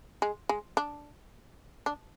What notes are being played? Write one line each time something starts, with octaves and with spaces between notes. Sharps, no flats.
G#3
G#3
D4
D4